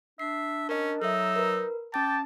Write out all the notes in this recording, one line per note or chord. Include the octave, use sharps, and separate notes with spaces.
D4 E5 C7
C#4 A#4 D#5
F#3 D#4 A4 E5 E6
A#4 B4
C#4 G5 A5 D6 A6